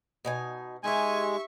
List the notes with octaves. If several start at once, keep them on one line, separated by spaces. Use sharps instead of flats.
B2 D#4 G#5
G#3 D#4 G4 E5 G#5 C#6